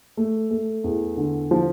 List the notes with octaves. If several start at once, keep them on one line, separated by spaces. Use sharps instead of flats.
A3
A3
E2
D3
F3